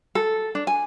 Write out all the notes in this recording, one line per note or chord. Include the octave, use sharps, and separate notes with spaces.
A4
D4
G#5